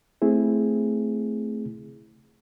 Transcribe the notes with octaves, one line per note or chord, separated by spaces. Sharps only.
A3 C4 E4 G#4